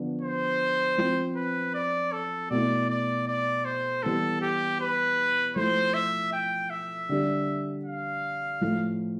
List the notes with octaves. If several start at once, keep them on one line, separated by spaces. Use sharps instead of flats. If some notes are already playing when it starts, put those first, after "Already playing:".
Already playing: D3 F3 B3 D4
C5
F3 C4 F4
B4
D5
A4
B2 A3 E4 D5
D5
D5
C5
E3 G3 B3 E4 A4
G4
B4
F3 A3 E4 C5
E5
G5
E5
D3 G3 D4
F5
A2 F3 A3 E4